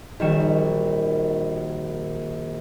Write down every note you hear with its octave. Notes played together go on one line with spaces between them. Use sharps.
A#1 D#3 G3 F#4 E7